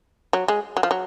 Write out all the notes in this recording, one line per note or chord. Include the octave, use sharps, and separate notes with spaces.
F#3
G#3
F#3
F3
F#3